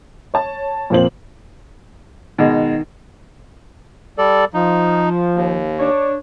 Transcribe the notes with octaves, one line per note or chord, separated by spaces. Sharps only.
C#5 A5
F2 A#2 F3 C4 F#7
B2 D#3 G#3
G3 A4 D5
F3 D#4
D#2
D4 C#5